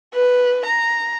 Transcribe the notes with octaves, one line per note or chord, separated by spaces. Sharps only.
B4
A#5